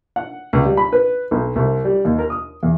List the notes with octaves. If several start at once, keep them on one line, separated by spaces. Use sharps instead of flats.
F#5
C#2
G3
B5
B4
B1
C2
G3
D#2
A#4
D#6
E2